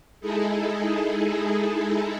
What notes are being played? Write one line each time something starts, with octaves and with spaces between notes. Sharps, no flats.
G#3 D#4 E4 G#4 A4